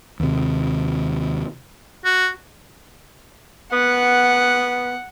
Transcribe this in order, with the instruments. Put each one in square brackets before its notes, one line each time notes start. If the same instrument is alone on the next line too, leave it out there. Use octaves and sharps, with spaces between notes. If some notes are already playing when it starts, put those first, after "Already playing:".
[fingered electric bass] D#2 C3
[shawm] F#4
[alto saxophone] B3 [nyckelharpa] F#5